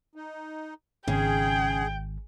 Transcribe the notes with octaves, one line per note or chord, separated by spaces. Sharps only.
D#4
G#1 C#3 G#4 G5